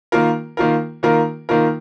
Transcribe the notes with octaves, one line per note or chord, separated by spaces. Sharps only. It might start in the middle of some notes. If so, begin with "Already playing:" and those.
D#3 A#3 F4 A#4
D#3 A#3 F4 A#4
D#3 A#3 F4 A#4
D#3 A#3 F4 A#4